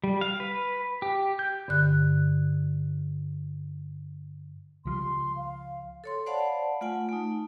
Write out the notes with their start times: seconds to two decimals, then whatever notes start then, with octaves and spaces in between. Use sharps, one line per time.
0.04 G3
0.21 F5
0.40 B4
1.02 G4
1.39 G6
1.68 G2 D3 F#6
4.85 C#2 F3 G3 C6
5.36 F5
6.04 A4 C#5 C6
6.26 C5 D5 F5 F#5 A5 B5
6.81 A3 F4 F#5 G#5
7.09 A3 D#4